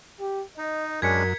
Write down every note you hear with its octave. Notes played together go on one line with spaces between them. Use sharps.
G4
D#4 D#5
F#2 G#3 C#4 D4 A#4 G#6 B6 C#7